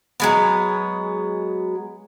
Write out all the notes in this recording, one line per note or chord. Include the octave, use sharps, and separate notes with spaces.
F#3 G#3 B3